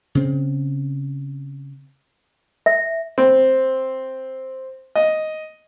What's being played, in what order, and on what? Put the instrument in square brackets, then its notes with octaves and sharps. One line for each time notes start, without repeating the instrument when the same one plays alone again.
[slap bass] C#3 C4
[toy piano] E5
[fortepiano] C4
D#5